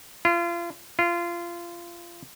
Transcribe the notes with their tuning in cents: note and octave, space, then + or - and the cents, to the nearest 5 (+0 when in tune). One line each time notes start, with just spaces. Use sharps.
F4 -35
F4 -25